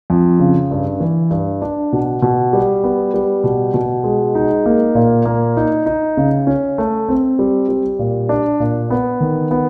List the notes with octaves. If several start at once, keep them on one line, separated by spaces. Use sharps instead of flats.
F2
C#3
G2
E3
G2
D4
B2
B2
G3
B3
G3
B2
B2
G#3
D#4
A#3
A#2
A#3
D#4
D#4
C#3
C#4
A3
C4
G3
G3
A#2
D4
A#2
B3
D#3
B3